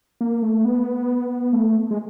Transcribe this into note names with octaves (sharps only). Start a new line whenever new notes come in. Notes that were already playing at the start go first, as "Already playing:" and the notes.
A#3
A3
B3
A3
G#3